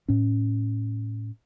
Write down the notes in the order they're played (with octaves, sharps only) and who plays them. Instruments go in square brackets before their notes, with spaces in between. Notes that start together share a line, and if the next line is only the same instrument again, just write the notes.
[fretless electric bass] A2 C#4